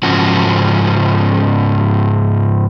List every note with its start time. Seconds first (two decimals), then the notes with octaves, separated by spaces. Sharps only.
0.03 G#2 C#3 F3 C#4 F#4